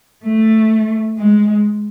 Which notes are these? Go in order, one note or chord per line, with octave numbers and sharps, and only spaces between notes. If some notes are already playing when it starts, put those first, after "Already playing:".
A3
G#3